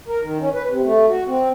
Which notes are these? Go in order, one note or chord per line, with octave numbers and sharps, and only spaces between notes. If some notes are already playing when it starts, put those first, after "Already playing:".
A#4
D#3
C#4
B4
C3
A3
F#4
C4